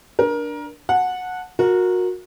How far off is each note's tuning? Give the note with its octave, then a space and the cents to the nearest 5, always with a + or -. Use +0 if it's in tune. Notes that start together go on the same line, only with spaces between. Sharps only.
D4 +0 A#4 +25
F#5 -15 A5 +0
F#4 -25 A#4 +0